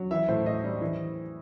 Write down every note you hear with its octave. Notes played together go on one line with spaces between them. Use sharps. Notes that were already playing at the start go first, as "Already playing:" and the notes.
Already playing: F#3
E3 E5
A2 C5
A2 D#5
G3
E3